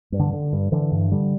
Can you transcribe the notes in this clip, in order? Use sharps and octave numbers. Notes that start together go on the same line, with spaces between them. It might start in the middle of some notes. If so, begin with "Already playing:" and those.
G2
D3
D3
G2
D3 E3
G2
D3 G3